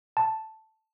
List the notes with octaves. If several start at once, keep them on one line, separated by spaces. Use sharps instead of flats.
A5